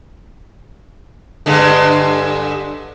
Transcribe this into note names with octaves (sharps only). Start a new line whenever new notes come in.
G2 D3 G#3